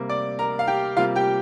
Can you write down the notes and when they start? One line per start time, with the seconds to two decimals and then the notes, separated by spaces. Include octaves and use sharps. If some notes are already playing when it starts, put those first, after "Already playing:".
Already playing: C3 G3 A#3
0.09 D5 D6
0.39 A#4 A#5
0.59 F5
0.67 G4 G5
0.97 C3 G3 A#3 F4 F5
1.15 G4 G5